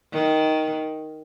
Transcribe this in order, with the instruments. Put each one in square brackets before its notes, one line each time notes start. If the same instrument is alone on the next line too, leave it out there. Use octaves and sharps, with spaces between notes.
[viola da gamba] D#3